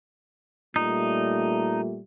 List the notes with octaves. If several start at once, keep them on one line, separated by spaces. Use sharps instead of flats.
A#2 G3 A3 D#4